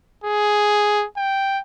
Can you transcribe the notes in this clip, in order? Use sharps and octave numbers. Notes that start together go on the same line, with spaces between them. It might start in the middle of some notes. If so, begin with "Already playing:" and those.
G#4
G5